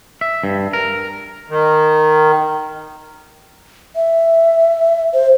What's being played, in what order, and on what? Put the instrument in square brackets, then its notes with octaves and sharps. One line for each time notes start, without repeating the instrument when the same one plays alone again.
[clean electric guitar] E5
G2
A#4
[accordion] D#3
[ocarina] E5
C5